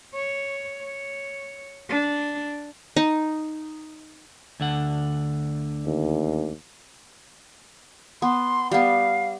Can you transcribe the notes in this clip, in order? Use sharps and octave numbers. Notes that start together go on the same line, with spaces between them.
C#5
C#5
D4
D#4
D2 D3 F#5
D#2
B3 C6
G3 B3 F5